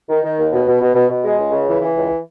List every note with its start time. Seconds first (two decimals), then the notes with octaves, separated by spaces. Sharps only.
0.09 D#3
0.22 D#3
0.38 D#2
0.52 B2
0.67 B2
0.81 B2
0.95 B2
1.09 B2
1.23 G#3
1.38 C#2
1.52 C#3
1.67 E3
1.82 E3
1.96 C#2